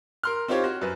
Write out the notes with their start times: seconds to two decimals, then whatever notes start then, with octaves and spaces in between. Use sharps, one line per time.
0.23 A#4 C6 F6
0.48 C4 D#4 F4 G4 C5 C#5
0.64 F#4
0.81 F#2 B4